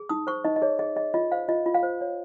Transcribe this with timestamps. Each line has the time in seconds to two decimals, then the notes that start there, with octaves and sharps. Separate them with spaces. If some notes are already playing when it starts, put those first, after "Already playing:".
Already playing: G#4
0.09 D#4 D#6
0.27 C5 C#6
0.45 D#4 D#5
0.56 D#5
0.62 G#4 C#5
0.79 G#4 D#5
0.96 G#4 D#5
1.14 F4 D#5
1.32 C5 F5
1.48 F4 D#5
1.66 F4
1.74 F5
1.83 C5
2.01 C#5